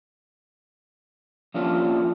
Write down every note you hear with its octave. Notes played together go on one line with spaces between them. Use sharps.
F3 A#3 C#4 D4 F4